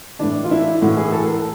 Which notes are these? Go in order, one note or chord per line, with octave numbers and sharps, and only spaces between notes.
A2 E3 D4
F4
E4
A2 E3 F#4
G#4
A4
A#4